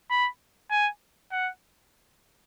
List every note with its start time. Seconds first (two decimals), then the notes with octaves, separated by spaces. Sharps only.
0.10 B5
0.70 G#5
1.31 F#5